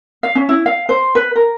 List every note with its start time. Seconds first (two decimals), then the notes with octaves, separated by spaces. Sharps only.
0.23 F5
0.35 C#4
0.49 E4
0.66 F5
0.89 C5
1.15 B4
1.36 A#4